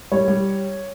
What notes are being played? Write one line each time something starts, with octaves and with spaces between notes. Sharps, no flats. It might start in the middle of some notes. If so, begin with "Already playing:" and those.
G3 C#5
G3